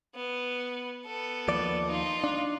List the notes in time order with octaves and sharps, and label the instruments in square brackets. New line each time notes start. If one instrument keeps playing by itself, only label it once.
[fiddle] B3
B3 A4
[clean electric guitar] D#2 F3 D5
[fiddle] D#4 F4
[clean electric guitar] D4